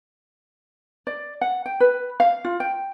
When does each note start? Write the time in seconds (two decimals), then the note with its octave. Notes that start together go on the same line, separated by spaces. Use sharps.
1.07 D5
1.41 F#5
1.66 G5
1.80 B4
2.20 F5
2.45 F4
2.60 G5